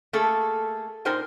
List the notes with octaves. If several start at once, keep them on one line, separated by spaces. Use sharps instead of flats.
A3 A#3 G#4 A4
A#2 D#4 A#4 C5 G5 G#5